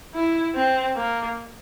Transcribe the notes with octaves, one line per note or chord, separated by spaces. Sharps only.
E4
C4
A#3